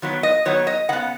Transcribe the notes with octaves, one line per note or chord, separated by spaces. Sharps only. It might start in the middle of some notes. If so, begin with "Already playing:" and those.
D#3 F#3 B3
D#5
D#3 F#3 B3 C#5
D#5
C#3 B3 F#5